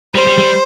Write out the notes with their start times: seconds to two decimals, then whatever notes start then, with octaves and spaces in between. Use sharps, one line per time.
0.15 G3 C5
0.27 G3
0.38 G3